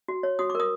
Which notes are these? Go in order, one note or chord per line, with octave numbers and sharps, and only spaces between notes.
F#4
C#5
F#4 D#6
D6
A#4 D#6